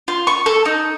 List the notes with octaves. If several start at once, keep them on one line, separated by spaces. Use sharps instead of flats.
F4
C#6
A4
D#4